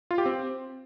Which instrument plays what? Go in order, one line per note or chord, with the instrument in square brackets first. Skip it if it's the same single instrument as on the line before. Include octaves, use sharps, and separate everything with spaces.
[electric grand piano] F4
G4
C4